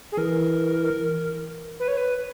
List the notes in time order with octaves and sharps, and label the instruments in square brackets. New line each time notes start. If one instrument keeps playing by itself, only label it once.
[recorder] G#4
[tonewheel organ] E3 [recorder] A#4
[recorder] B4
C#5
B4